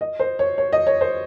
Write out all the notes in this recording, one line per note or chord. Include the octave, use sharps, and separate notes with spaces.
D#5
C5
C#5
C#5
D#5
C#5
C5